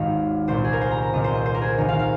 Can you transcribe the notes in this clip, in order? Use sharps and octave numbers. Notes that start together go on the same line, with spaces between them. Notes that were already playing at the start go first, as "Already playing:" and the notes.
Already playing: G#1 D#2 G#2 D#3 F5
C2 A#2 C5
G#4
A#4
C5
A#5
A#5
C2 A#2 D#5
C5
D#5
C5
A#4
G#4
D#2 D#3 A#4
F5
F5